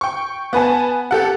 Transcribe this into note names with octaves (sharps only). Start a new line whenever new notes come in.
G5 C#6
B3 B4 G#5 A5
G4 A4 F#5